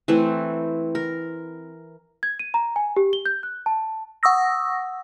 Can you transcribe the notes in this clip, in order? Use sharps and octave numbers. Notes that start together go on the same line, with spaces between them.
E3 A3 C4
A#4
G#6
D#7
A#5
G#5
G4
G7
G6
F#6
A5
F#5 C#6 D#6 E6 A#6